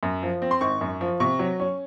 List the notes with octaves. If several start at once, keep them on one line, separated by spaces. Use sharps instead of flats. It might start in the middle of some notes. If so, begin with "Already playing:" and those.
F#2
F3
C4
C6
G#1 C#6
F#2
F3
C3 C#6
F#3
C#4